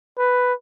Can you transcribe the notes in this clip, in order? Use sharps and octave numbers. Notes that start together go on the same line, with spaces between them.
B4